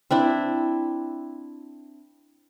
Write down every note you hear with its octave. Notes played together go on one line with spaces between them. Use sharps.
C4 D4 E4